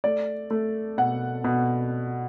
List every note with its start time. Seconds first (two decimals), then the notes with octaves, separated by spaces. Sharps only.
0.04 A3 D5
0.50 A3
0.98 B2 F#5
1.44 B2